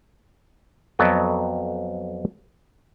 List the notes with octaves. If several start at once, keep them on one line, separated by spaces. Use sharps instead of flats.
F2 F#3 B3 A4 D5 D#5